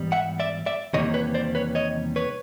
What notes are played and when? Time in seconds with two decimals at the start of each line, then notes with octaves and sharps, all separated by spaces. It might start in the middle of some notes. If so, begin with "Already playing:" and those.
Already playing: G#2 E3 G3 B3
0.12 E5 F#5
0.40 D5 E5
0.66 D5 E5
0.94 E2 C3 D#3 G3 A#3 C#5 D#5
1.14 B4 C#5
1.34 C5 D5
1.55 B4 C#5
1.75 C#5 D#5
2.16 B4 C#5